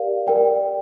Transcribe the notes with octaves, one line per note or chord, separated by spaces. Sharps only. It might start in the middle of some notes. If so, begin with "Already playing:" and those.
Already playing: G4 A#4 D5 F5
A#4 D5 G5